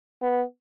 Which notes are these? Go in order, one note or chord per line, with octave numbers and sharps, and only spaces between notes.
B3